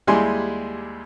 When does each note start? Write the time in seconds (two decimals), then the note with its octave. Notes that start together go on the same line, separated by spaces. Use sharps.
0.07 D#2 G3 G#3 E4 G#5 C6